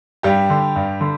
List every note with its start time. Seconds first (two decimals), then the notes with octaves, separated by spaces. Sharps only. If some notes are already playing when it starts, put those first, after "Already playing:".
0.23 G2 G3 G4
0.50 D3
0.76 G2
1.01 D3